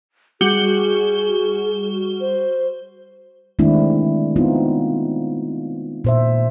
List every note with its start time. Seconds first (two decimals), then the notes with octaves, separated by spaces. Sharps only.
0.41 G3 F#4 G#4 G7
2.21 C5
3.59 D#3 G#3 A3 C4 D4 E4
4.36 B3 C4 D#4 F4
6.05 A#2 C5 E5